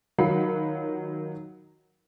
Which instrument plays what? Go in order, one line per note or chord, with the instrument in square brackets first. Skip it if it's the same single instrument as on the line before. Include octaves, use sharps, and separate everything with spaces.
[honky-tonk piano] D#3 F#3 F4 F#5 B5 C7